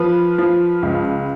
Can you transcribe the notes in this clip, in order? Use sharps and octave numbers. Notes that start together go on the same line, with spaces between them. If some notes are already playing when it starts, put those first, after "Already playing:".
Already playing: F3 B4
F3
C#2